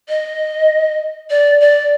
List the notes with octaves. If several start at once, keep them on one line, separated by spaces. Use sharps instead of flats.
D#5
D5
D5